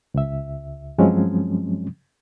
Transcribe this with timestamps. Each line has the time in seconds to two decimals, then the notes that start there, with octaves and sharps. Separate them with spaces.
0.14 C#2 E5
0.98 G2 F3 F#3 G#3 C4 C#4